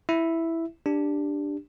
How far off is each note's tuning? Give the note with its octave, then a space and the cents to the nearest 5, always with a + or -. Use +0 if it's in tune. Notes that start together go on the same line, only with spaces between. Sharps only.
E4 +0 E5 +0
D4 +0 G4 +15